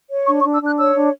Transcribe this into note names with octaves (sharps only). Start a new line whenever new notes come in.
C#5
D4 C#6
C#6
D4
E6
D4 F#6
C#5 E6
D4